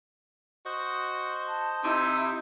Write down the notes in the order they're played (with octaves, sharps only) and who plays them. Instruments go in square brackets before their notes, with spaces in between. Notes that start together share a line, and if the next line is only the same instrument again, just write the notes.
[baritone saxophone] F#4 [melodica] C5 D#5
[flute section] A5
[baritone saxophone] C3 [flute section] D#4 E4